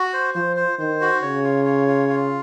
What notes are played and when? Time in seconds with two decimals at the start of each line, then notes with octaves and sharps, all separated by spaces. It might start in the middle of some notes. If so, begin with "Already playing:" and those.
Already playing: F#4
0.13 C5
0.35 F3 C5
0.57 C5
0.79 D#3 C5
1.01 F#4
1.22 C#3 C#5
1.44 F4
1.65 C#5
1.88 F4
2.09 F4